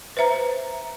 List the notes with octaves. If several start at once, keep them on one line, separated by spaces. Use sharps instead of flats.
B4 C5 E5 A#5